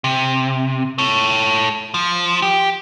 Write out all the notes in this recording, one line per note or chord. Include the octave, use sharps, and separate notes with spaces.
C3
A4 C#5
F3
G4